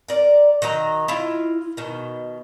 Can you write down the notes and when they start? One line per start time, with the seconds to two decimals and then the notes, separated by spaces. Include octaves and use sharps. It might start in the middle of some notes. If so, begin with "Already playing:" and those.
0.08 A#4 D5
0.62 D#3 F#3 D#5 A#5
1.08 E4 F4 D#5
1.77 B2 D#3